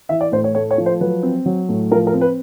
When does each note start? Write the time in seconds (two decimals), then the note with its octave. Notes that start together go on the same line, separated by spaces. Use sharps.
0.09 E3 E5
0.21 D5
0.32 A2 C5
0.44 C#5
0.55 A3 C#5
0.71 C#5
0.78 F3
0.86 C5
1.00 F#3 B4
1.23 C4
1.46 F#3
1.69 A2
1.91 F3 A#4
2.07 A#4
2.14 C4
2.21 B4